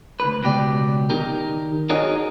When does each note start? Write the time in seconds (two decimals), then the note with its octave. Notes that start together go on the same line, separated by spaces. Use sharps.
0.20 D2 B4
0.42 C#2 B2 G4 D5
1.10 D#3 D#4 G4 A#4
1.90 D#4 F#4 G#4 A#4 C#5 D#5